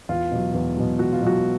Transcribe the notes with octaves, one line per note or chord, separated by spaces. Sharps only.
E2 F4
B2 F#3
E2
B2 F#3
E2 F#4
F4
B2 F#3 F#4